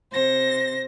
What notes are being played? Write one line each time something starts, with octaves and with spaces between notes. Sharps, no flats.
C3 C5 A#6